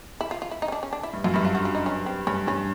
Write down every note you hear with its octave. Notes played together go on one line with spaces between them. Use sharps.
E4
F4
F4
E4
D#4
C#4
D4
C#4
D4
E4
G2
F#2 F4
G2 E4
F4
F#4
F4
D#4
C#4
C4
G2 C#4
G2 C#4